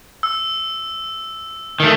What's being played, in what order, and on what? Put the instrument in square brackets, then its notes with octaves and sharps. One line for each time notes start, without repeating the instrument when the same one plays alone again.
[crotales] E6
[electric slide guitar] D#3 A3